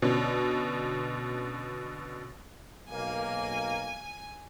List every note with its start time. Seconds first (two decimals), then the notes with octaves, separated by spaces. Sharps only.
0.02 B2 D3 C#4
2.88 B1 A#3 G#5